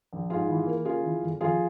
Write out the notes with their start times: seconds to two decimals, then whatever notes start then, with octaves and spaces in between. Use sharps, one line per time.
0.13 A#1
0.30 G#2 F4 G#4
0.49 E3
0.67 A#3
0.85 C#3 F4 G#4
1.03 E3
1.22 G1
1.41 F2 F4 G#4